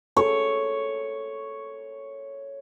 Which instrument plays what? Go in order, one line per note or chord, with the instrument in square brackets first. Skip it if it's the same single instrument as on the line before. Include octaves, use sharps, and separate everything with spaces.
[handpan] A4 [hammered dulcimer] C#5